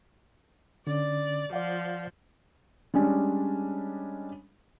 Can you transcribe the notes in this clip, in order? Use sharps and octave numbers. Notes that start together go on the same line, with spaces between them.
D3 C#4 D5
F3 D5 F5 F#5
G3 G#3 C#4 D4